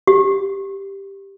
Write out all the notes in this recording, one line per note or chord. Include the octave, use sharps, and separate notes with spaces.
G4